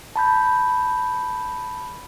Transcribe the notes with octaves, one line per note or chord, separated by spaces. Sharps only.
A5 B5 G6